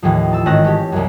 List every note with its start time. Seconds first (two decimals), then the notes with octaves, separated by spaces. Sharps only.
0.03 D#2 A2 E3 F3
0.33 A5 E6
0.46 G#1 D#3 C#4 A5 F#6 A#6
0.64 C#4 G4
0.92 C2 F#2